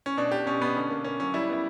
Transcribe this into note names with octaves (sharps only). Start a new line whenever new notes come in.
C#4
B2 D4
B2 G4
B2 C#4
B2 B3
D3 C#4
A#3
A#3 C#4
F#3 C#4
G3 E4
B3 E4